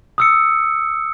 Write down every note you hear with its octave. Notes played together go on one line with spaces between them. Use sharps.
D#6 E6 C#7